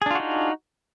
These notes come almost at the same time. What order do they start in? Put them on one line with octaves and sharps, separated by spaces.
G#4 D4 F4 F#4 D#4